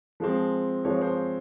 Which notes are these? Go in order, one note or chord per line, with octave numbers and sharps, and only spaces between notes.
F3 G#3 C4
F3 G#3 C4 C#5
C5